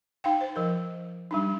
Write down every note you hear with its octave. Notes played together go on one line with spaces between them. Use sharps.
D#4 F5 G5
C5
F3 A#4
G3 D4 D#4